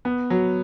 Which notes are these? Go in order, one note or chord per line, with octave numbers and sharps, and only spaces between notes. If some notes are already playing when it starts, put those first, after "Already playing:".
B3
F#3